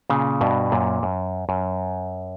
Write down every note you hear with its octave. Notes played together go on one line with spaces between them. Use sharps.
A#2 C#3
G2 B2
F#2 A#2
F#2
F#2